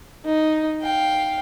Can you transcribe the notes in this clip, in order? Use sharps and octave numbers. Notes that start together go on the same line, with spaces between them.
D#4
F5 G5